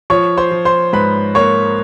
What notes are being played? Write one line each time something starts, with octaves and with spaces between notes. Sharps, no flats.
F3 C#5 C#6
C5 C6
F3
C5 C6
G#2 B4 B5
A#3 C#5 C#6